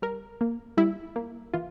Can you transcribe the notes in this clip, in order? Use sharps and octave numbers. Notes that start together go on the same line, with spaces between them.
G3 A#4
A#3
G3 E4
A#3
E3 F4